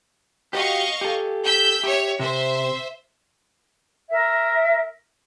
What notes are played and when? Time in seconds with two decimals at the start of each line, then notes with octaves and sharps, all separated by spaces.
0.53 F#4 G4 D#5 F5 C#6
1.01 G4 A4
1.45 E6 G6 B6
1.84 G4 C#5 E5
2.19 C3 C5 E5
4.10 A#4 E5